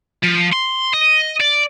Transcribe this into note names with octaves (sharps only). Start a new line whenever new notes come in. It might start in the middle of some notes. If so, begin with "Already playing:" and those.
F3
C6
D#5
D5